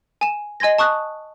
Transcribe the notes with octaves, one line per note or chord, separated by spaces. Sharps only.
G#5 E7
D#5 G#5 C6 G#6 A#6
A5 C#6 D#6 F#6